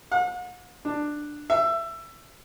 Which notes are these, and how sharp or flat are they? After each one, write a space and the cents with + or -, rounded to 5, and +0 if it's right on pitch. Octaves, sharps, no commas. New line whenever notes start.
F#5 -45
D4 +10
E5 +20